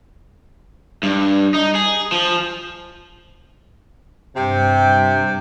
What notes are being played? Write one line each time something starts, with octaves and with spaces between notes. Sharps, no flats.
G2
D#4
G#4
F3
G2 C3 G5